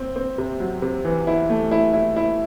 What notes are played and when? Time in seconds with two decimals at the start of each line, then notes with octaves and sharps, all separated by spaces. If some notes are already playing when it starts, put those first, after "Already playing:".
Already playing: C4
0.16 C4
0.38 C3
0.60 F#3
0.82 C3
1.04 E3
1.27 E4
1.50 A3
1.71 E4
1.93 E4
2.16 E4